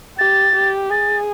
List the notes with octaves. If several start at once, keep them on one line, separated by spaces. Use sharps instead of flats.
G4 A6
G4
G#4 A6